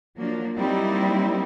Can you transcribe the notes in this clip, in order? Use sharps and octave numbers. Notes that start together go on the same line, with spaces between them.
F3 F#3 A#3 D4
F#3 G3 A#3 C4 D#4 E4